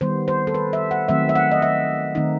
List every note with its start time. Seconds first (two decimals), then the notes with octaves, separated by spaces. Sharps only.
0.01 D#3 G3 B3 C5
0.28 C5
0.47 A4
0.54 B4
0.73 E5
0.91 F#5
1.08 D#3 F#3 A3 C4 E5
1.29 E5
1.35 F#5
1.51 D#5
1.62 E5
2.15 D#3 A3 C4 D#4